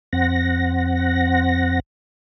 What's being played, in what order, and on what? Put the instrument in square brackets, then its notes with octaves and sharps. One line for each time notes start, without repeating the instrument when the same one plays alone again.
[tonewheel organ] F2 C4 F#5 A#6